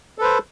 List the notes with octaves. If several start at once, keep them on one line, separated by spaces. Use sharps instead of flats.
A4 B4 C5